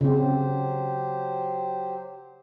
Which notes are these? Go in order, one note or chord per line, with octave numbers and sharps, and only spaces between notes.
C#3 F#3 C4 G4 C5